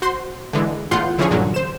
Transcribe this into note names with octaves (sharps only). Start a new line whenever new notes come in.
F#4 C5 C6
D3 E3 G#3
E2 A2 F4 F#5 C6 G6
D3 E3 F3 C#4 G#4 C#5
G2 A#2 D3 F#3
C5 E7